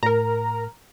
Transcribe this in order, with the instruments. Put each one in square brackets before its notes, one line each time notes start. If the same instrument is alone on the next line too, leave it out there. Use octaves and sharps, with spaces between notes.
[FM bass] A2 [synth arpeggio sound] A#4 A#5